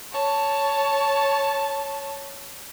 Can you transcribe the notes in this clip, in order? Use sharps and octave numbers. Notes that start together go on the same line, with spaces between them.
C#5 A5